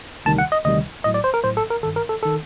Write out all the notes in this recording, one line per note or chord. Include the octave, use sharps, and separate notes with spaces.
D2 C3 D#3 G3 A5
F#5
D#5
D2 C3 D#3 G3 D#5
A1 A2 F#3 D#5
D5
C5
A#4
A1 A2 F#3 C5
A4
A#4
G1 G2 D#3 A4
A#4
A4
D#3 A4